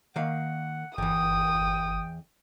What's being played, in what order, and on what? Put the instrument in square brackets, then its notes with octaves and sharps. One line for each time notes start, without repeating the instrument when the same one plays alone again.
[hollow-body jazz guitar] D#3 A#3 F5 [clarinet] F#5
[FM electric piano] G1 [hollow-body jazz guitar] E2 E3 [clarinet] G5 [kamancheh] D#6